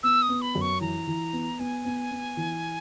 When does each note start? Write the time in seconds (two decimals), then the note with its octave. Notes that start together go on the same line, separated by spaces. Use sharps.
0.03 B3 E6
0.22 D#6
0.29 B3
0.42 B5
0.55 F#2
0.61 C#6
0.81 E3 A#5
1.07 E3
1.33 B3
1.59 B3 G#5
1.85 B3
2.11 B3
2.37 E3